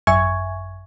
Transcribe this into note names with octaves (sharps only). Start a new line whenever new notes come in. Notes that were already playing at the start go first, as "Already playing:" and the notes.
G#1 F#2 E5 G#5 C#6 G#6